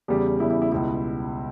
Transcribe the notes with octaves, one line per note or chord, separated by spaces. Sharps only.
E2 C#3 G3 G4
E2 C#3 G3 E4
E4
E4
C#2 B2 G3 E4